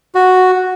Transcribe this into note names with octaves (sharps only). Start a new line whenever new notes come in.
F#4